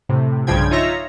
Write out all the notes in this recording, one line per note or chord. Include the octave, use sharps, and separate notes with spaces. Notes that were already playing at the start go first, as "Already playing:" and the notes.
A2 C3
B1 G2 C#3 F3 G5 G#6
D#4 F4 C#5 E5 A#5